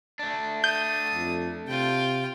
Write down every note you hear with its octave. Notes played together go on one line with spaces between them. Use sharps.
A3 D4
D#6 G6
F2
C3 F4 G5